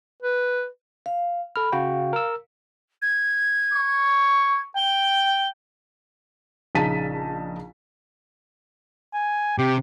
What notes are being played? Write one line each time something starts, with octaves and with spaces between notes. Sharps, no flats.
B4
F5
A4 B5 F6
C#3 F#4 F5 G5
A#4 E6
G#6
C#6
G5 G7
A#1 C#3 D#4 A5 B6 D#7
G#5
C3 G4